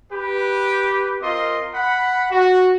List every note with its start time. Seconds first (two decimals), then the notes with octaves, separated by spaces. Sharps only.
0.12 G4 B4
1.22 C4 F4 A#4 D#5 C6
1.75 F#5 B5
2.31 F#4